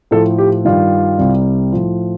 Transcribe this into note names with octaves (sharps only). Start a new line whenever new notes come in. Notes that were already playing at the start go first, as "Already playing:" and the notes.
A2 F3 A4
G4
G2 D#3 G3 F4
C2 C3 G3
A2 F3